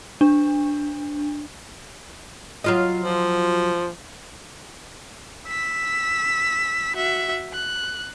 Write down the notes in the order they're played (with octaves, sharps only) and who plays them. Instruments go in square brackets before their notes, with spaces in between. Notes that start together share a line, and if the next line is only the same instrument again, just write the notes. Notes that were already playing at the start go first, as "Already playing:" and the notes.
[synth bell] D4
[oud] F#3 F4 D#5
[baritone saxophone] F3
[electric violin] E6 B6
F#4 E5
F#6